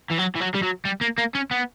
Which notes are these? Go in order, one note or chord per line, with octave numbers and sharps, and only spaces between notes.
E3
F#3
E3
F#3
G3
F#3
G3
A#3
A#3
C#4
B3